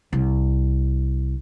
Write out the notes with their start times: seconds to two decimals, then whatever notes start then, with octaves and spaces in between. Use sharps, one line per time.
0.13 C2